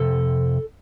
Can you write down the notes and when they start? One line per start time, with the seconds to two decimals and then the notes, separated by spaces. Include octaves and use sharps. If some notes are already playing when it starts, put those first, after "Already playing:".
Already playing: F2 C3 A4